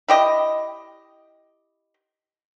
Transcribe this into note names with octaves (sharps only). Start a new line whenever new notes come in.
E4 G4 D#5